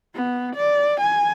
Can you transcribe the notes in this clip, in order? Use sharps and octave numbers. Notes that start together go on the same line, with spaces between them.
B3
D5
G#5